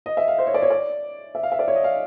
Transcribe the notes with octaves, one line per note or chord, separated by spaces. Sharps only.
D#5
E5
F5
C5
C#5
D5
C#5
D5
E5
F5
E5
D5
C#5
D#5
F5